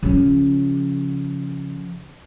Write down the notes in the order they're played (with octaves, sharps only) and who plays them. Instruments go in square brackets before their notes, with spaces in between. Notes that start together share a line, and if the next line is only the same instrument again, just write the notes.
[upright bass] C#3 F3